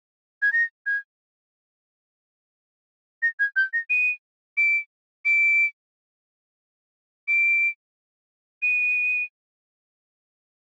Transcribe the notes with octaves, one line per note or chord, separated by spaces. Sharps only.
G#6
A#6
G#6
A#6
G#6
G6
A#6
D#7
D7
D7
D7
D#7